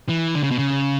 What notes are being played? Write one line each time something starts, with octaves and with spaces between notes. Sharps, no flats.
E3
D3
C#3
B2
C#3